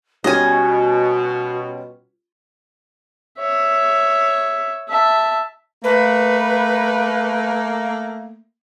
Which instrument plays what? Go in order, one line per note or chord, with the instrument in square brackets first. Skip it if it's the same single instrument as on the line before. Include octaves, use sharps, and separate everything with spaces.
[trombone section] B2 [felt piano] G3 C#4 F4 [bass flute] F#4 [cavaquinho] D#5 G#5
[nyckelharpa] C#5 E5
E5 A5
[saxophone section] A3 A#3 [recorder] B4